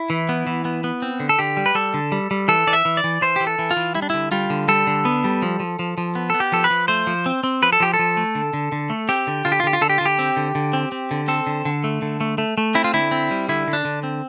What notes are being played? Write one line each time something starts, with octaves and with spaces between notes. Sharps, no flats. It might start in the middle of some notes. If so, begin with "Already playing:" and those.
Already playing: E4
E3
B3
E3
B3
B3
C4
D3
A4
D3 G4
G3
B4
G3 A4
D3
G3
G3
E3 A4
E3 D5
E5
E3
D5
E3
E3 C5
E3 G4
A4
E3
F4
E3
G3 E4
D4
D3 E4
G3 F4
D3
G3 A4
D3
B3
G3
F3
F3
F3
F3
B3
B3 A4
G4
F3 A4
B4
F3
A3 C5
F3
C4
C4
F3 B4
A4
F3 G4
A4
F3
A3
D3
D3
D3
A3
C4 G4
D3
D3 F4
G4
F4
D3 G4
F4
D3 A4
G4
D3 F4
G4
C4
D3
D3
C4
C4
D3
C4 A4
D3
D3
A3
D3
A3
A3
A3
C4 E4
F4
D3 E4
C4
G3
D3 E4
D3
D4
D3
C4